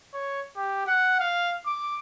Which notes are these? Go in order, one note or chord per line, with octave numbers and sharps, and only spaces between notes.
C#5
G4
F#5
F5
D6